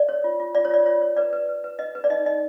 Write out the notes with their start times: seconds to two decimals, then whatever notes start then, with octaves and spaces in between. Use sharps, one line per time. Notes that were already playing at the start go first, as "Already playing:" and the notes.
Already playing: D5
0.09 C#5
0.24 F4
0.40 F4
0.55 F4 D5
0.65 C#5
0.71 F4 D5
0.86 F4 C#5
1.02 C#5
1.17 B4 D5
1.33 B4
1.49 B4
1.64 B4
1.79 B4 D#5
1.95 B4
2.04 D5
2.10 D#4 D#5
2.26 D#4 D#5